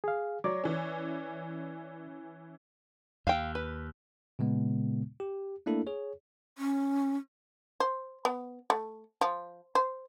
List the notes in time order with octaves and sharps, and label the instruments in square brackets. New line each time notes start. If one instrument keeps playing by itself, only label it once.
[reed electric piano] G#4 F5
[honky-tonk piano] F#3 [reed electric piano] C#5 D5 D6
[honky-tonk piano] E3 C#4
[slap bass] D#2 [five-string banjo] F5 G5
[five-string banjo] B4
[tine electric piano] A#2 C#3 G#3 B3
G4
A3 A#3 D4 E4 A4
G#4 C#5
[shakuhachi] C#4
[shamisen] C5
B3
A3
F3
C5